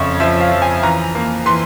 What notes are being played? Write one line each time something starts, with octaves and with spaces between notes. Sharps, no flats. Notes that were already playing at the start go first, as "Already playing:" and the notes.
Already playing: F2 C#3 C#5 E5
F3 E5
F5
F3
G#5
E3 A#5
A#3
E3 C6